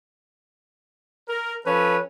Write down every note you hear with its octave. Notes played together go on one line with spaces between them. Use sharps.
A#4
F3 C#4 A4 B4